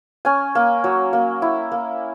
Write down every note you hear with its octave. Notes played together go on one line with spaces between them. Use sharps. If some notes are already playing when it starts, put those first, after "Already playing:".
C#4 G#5
A#3
F#3
A#3
E4
A#3